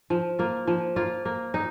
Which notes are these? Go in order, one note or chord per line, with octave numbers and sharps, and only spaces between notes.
F3
A#3 F4
F3
A#3 F4
A#3
D#4